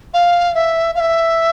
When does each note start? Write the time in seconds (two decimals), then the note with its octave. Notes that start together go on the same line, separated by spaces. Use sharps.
0.14 F5
0.55 E5
0.95 F5
1.00 E5